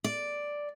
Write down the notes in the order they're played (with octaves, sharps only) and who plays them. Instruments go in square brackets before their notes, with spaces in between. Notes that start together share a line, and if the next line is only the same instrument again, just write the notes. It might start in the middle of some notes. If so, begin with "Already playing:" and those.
[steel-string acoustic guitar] D5